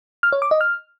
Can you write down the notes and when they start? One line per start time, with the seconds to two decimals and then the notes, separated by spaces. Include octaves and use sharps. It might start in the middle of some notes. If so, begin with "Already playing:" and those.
0.23 F6
0.32 C#5
0.42 D6
0.51 D#5
0.61 F6